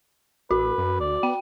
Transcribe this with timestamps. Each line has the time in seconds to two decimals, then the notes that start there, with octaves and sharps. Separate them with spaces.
0.51 A1 F#4 B4
0.78 F#2
1.00 D2 D5
1.23 B3 G5